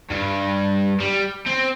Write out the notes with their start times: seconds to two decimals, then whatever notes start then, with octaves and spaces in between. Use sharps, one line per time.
0.10 G2
1.00 G3
1.46 C4